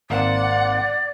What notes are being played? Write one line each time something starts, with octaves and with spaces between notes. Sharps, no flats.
G#1 A#3 C4 D5 F#5